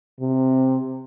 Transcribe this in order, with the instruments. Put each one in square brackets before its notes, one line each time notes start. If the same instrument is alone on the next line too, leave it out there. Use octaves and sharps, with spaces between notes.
[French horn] C3